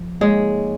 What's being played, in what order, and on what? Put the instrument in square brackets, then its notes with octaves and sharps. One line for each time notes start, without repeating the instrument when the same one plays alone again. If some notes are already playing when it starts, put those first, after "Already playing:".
Already playing: [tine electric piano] F3
[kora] G#3 [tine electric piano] A#3 D#4 C#5